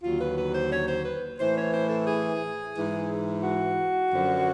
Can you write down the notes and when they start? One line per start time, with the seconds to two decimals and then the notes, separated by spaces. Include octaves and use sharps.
0.03 D#2 D3 F#3 F4
0.20 B4
0.37 B4
0.54 C5
0.72 C#5
0.88 C5
1.05 B4
1.39 A2 E3 C5
1.56 C#5
1.73 C5
1.89 A4
2.07 G#4
2.75 G#2 E3
3.43 F#4
4.11 F#2 D3 F3